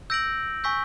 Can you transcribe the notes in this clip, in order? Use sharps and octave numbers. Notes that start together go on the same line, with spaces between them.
E6 G6 A#6 D7 F#7
G#5 C#6 E6 G6 B6